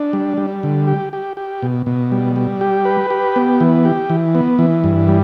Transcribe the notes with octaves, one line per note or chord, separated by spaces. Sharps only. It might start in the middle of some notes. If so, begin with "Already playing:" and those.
Already playing: D4
G3
G3
D3
G4
G4
G4
B2
B2
G3
G3
G4
B4
G4
B3
E3
G4
E3
B3
E3
G2
G3